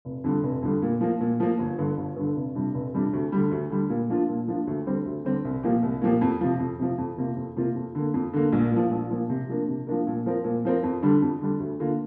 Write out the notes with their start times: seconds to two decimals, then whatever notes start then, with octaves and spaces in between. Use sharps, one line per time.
0.05 F1
0.24 F2 D3 G3
0.43 F1
0.62 F2 D3 G3
0.82 A#2
1.01 F3 A#3
1.21 A#2
1.40 F3 A#3
1.59 G1
1.78 G2 D3
1.97 G1
2.16 G2 D3
2.36 F1
2.55 F2 C3 G3 D4
2.74 F1
2.94 F2 C3 G3 D4
3.13 D2
3.32 D3 G3
3.51 D2
3.70 D3 G3
3.90 A#2
4.10 F3 A#3 D4 F4
4.29 A#2
4.48 F3 A#3 D4 F4
4.67 D2
4.86 D3 G3 C4 G4
5.05 D2
5.25 D3 G3 C4 G4
5.45 C2
5.63 A#2 F3 A#3 G4
5.83 C2
6.02 A#2 F3 A#3 G4
6.21 F2
6.41 C3 F3
6.60 F2
6.79 C3 F3
6.98 F2
7.18 C3 A#3 F4
7.36 F2
7.57 C3 A#3 F4
7.76 F2
7.95 D3 A#3
8.14 F2
8.33 D3 A#3
8.52 A#1
8.72 A#2 F3
8.91 A#1
9.10 A#2 F3
9.30 C3
9.48 F3 A#3 D4 A#4
9.68 C3
9.87 F3 A#3 D4 A#4
10.07 A#2
10.26 F3 C4 A#4
10.44 A#2
10.65 F3 C4 A#4
10.83 F2
11.02 D3 G3 D4
11.22 F2
11.41 D3 G3 D4
11.60 D2
11.80 D3 A#3 F4